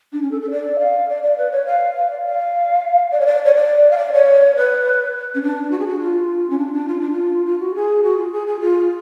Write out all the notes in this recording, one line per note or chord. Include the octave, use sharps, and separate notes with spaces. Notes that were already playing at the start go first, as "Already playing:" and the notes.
D4
C#4
A4
A4
D5
F5
D5
D5
B4
C#5
F5
F5
D5
F5
D5
C#5
D5
C#5
D5
F5
D5
C#5
B4
C#4
D4
F#4
G#4
F#4
F4
C#4
D4
D4
F4
D4
F4
F4
F#4
G#4
F#4
F4
G#4
G#4
F4